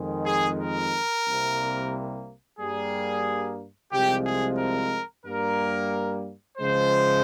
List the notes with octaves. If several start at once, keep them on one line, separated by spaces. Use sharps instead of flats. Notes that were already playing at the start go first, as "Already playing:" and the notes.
Already playing: F2 D#3 G#3
G#4
A#4
C2 C3 G3 A#3
G2 G3 A#3 G#4
C2 C3 F3 G#3 G4
G#4
A#4
G2 G3 A#3 A#4
C#2 C#3 F3 G#3 C5